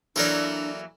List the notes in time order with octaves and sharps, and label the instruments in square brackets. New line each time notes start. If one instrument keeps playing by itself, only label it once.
[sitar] E3 F#3 A#3 [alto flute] D4 [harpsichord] A4 A#4 D5